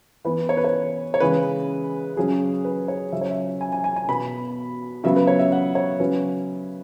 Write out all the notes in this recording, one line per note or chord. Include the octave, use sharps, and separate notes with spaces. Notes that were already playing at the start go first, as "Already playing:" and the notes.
E3 B3 B4
C#5
B4
C#5
C#5
C#3 E3 G#3 B4
C#3 F#3 C#4 G#4
B4
C#5
C#3 F#3 C#4 E5
C#5
E5
G#5
G#5
G#5
G#5
B2 B3 B5
C#3 F#3 B3 E5
B4
C#5
E5
F#5
C#5
C#3 F#3 C#4 B4